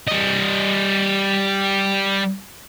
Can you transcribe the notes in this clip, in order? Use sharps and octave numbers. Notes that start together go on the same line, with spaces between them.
G3 D#5